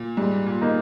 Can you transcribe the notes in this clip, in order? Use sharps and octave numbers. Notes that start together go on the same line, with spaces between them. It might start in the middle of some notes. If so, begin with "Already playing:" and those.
Already playing: A#2
G#2 G3
A#2
A#3 D#4